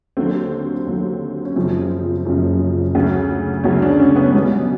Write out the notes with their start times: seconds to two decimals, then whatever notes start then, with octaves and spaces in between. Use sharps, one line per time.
0.17 D#2 D3 F#3 C4
0.87 D#2 D3 F#3
1.45 C#4
1.56 F#1 F#2 C#3 F3 C4
2.25 F#1 F#2 C#3 F3
2.95 D2 C#3 F#3
3.64 D2 C#3 F#3 C#4
3.82 D4
4.00 C#4
4.16 B3
4.34 B1 B2 G3